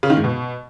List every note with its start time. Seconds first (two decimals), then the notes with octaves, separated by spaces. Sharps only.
0.03 C#3
0.10 D#3
0.17 G#2
0.24 B2